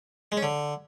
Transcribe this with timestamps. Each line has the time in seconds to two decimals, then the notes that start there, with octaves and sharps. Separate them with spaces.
0.32 G#3
0.37 C#4
0.43 D3